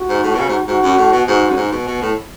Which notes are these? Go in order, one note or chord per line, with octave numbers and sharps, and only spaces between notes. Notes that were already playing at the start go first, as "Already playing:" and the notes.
Already playing: F#4
G#2
A2
B2
C#3
G#2
G#2 F#4
F#2
A2
B2
G#2 F#4
F#2
G#2
B2
B2
A2